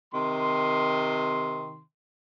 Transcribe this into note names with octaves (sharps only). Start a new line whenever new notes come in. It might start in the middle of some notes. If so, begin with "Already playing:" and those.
C3 D#3 C6